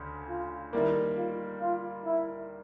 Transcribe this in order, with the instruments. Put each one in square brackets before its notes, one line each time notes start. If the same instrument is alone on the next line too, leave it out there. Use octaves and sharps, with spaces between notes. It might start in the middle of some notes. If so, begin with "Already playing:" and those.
Already playing: [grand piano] D2 C#3
[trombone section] F4
[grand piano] D#3 G3 A#3 [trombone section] E4
[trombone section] F4
F4
E4